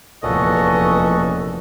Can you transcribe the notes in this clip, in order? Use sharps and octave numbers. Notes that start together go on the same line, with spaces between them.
F1 E2 A#2 C#4 F#4 A4 D#5